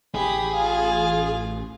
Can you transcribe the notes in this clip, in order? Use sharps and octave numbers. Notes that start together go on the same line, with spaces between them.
A1 G4 G#4 B5
F4 F5